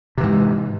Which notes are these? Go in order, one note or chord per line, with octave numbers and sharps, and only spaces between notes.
G#2 C3 E3